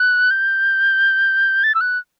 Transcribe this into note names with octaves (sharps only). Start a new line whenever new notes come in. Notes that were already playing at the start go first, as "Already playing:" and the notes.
Already playing: F#6
G6
A6
E6
F#6